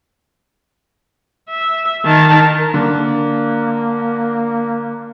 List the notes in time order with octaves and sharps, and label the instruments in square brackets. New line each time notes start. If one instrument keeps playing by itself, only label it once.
[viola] E5
D#3 A5
[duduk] A#4
[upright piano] D3 [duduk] A#3
[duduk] A#3